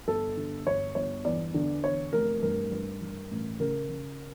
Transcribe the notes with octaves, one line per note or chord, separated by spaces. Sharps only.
G1 A4
D3
G1 C#5
G1 C#5
E2 D5
D3
E2 C#5
F1 A#4
G2 A#4
G2
G2
A1
C#3 A#4
C#3